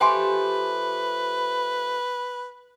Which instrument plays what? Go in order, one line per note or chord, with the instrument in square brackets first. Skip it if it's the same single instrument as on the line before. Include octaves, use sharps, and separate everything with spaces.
[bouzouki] F3 A3 G4 [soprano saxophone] B4 [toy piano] G5 G#5 C6